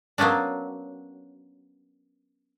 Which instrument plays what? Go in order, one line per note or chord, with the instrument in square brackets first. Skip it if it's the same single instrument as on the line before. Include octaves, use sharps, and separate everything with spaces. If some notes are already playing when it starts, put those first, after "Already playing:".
[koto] F#3 A#3 B3 C#4 D4